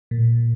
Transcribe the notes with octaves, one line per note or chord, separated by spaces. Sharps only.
A#2